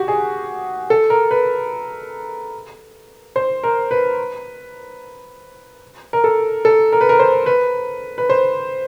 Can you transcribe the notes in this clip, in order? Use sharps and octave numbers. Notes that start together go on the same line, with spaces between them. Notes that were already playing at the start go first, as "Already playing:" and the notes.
Already playing: F#4 G4
G#4
A4
A#4
B4
C5
A#4
B4
A#4
A4
A4
A#4
B4
A#4
C5
B4
B4
C5